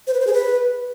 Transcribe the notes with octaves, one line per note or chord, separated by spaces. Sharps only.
C5
B4
C5
G#4
B4